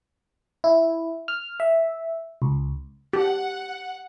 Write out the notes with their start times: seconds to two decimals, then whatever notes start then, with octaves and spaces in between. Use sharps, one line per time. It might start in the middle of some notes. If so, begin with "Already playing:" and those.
0.64 E4
1.28 F6
1.60 E5
2.42 C#2
3.13 G4 F#5